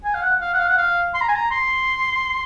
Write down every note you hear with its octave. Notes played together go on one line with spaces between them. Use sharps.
G#5
F5
F#5
F5
F#5
F5
F#5
F5
C6
A#5
G#5
A#5
C6